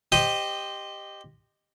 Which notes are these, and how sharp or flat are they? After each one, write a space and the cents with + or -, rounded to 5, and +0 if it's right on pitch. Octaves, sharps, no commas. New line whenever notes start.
G4 +5 C5 +0 D#5 -15